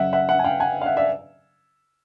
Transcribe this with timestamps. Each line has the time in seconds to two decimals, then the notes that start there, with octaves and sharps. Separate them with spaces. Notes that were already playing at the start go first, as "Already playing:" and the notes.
Already playing: F#2 C#3 F#3 E5 F#5
0.13 E5 F#5
0.29 E5 F#5
0.39 G#5
0.44 F5 G5
0.60 F#5 G#5
0.81 F5
0.86 E5 F#5
0.97 D5 E5